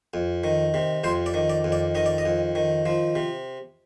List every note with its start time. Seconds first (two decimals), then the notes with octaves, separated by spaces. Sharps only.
0.14 F2
0.44 D#3
0.74 C3
1.04 F2 C5
1.26 D5
1.34 D#3
1.49 D5
1.64 F2
1.72 D5
1.95 D#3 D#5
2.06 D5
2.18 D#5
2.25 F2
2.55 D#3
2.86 F3
3.15 C3